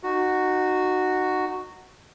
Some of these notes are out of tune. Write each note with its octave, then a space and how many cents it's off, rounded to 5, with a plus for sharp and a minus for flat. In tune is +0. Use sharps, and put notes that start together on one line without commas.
D#4 -25 F#4 +0